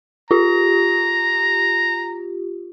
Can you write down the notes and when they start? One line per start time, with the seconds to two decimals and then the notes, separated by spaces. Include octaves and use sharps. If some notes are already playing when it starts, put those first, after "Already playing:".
0.31 F4 G4 A#5